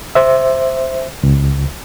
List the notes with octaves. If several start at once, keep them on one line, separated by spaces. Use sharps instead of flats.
C5 E5
C#2